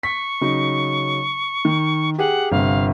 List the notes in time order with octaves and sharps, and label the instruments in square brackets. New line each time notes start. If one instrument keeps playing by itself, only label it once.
[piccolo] C#6 [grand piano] B6
[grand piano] C#3 F#3 D#4
D#3
[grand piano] G4 G#4 [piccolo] F#5
[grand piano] G1 C3 [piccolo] F5